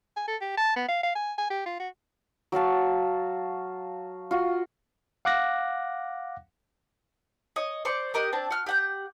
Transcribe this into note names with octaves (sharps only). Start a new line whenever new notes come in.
G#5
A4
G4
A5
B3
F5
F5
G#5
G#5
G4
F4
F#4
F#3 F#4 F5 A5
F4 F#4
F5 F#5 D6 F#6 A#6
C#5 D#5
C5 D5 C#6
G4 A#4 D#5 F#5
C4 D4 A5
F#4 F6
G4 F#5 G6